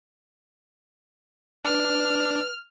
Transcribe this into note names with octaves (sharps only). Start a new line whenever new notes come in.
D4 B4 F6